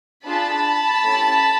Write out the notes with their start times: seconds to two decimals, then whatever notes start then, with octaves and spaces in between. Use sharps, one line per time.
0.25 D4 F4 G#4 A5 B5
1.04 A3 C#4 E4 G4